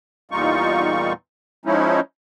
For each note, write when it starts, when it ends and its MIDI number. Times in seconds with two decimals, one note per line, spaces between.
0.31 1.13 40
0.31 1.13 46
0.31 1.13 55
0.31 1.13 63
0.31 1.13 65
0.31 1.13 85
1.66 2.00 53
1.66 2.00 56
1.66 2.00 61
1.66 2.00 63
1.66 2.00 64